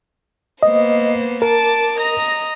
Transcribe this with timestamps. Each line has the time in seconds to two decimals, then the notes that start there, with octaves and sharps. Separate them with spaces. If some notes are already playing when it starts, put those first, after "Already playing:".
0.63 A#3 B3 C5 D#5
1.42 A#4 A5 D6
1.97 D#5 A#5 A#6